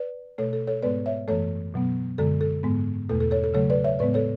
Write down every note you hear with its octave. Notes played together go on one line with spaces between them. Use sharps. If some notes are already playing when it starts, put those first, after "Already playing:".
Already playing: B4 D5
B2 A3 A4 C#5
A4
A4 C#5
G#2 G#3 B3 B4 D5
C#5 E5
F#2 E3 A3 A4 C#5
B2 F#3 B3
F#2 D3 G#3 A4
A4
G#2 G#3 B3
E2 B2 A3 A4
A4
A4 C#5
A4
C#3 F#3 A3 A4 C#5
B4 D5
C#5 E5
A2 G#3 B3 B4 D5
A4 C#5